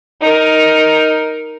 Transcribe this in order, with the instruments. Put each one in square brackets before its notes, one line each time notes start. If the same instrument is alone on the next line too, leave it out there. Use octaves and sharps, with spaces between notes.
[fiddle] D#4 A#4